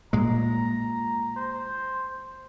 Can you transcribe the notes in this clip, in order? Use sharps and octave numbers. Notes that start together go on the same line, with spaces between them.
A#2 G#3 A#5
C5